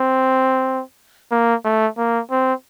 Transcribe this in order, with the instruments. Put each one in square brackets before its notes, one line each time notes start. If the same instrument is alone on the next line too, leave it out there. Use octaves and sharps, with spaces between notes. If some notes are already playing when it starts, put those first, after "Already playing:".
Already playing: [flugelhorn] C4
A#3
A3
A#3
C4